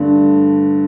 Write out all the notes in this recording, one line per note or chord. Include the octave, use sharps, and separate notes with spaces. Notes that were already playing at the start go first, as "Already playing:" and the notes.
Already playing: G2 D3 A3